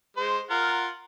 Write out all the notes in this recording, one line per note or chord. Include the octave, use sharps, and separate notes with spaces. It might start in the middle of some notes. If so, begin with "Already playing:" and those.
G#3 C5
F4 A#4 F#5